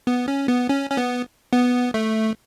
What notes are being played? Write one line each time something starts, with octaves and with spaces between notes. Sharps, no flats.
B3
C#4
B3
C#4
C#4
B3
B3
A3